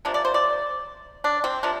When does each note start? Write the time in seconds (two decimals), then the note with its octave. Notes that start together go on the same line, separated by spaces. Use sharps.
0.05 C3 F3 A#3 D4
0.14 D5
0.25 C5
0.34 D5
1.24 D4
1.44 C4
1.63 C3 F3 A#3 D4